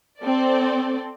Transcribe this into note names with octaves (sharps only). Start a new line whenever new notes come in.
C4 A4 D5